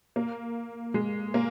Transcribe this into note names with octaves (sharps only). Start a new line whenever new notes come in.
A#3
G#3
A#3